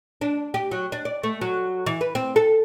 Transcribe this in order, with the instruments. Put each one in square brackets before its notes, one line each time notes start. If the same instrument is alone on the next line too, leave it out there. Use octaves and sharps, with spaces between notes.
[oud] D4
G4
F#3
D4
D5
A3
F#3
E3
B4
C4
A4